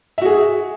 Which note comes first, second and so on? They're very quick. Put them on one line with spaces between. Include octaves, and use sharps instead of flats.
E5 F#4 G#4